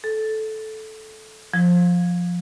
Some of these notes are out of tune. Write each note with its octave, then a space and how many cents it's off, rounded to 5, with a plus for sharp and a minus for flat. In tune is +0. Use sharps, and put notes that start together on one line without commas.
A4 -15
F3 +10